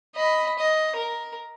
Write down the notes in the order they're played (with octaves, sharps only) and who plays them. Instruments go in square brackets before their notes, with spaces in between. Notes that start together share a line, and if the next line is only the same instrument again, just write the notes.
[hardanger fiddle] D#5 B5
D#5
A#4